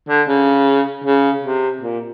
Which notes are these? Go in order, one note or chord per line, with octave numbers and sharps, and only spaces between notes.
D3
C#3
C#3
C3
A#2